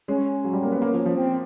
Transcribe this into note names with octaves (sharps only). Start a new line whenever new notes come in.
G#3 C#4
F#3
G3
A#3
B3
A#3
F3
F3
C4